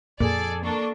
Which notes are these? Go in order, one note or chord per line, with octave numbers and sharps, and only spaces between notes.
F2 A#2 G#4 A4 D5
A#3 D4 A4 C#6